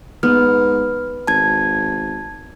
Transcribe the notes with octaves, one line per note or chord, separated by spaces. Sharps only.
G#2 B3 F6
G#1 A5 G#6